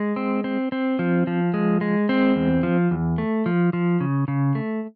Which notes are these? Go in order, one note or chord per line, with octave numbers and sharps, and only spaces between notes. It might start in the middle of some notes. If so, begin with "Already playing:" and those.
Already playing: G#3
C4
C4
C4
F3
F3
G#3
G#3
C4
E2
F3
E2
A3
F3
F3
C#3
C#3
A3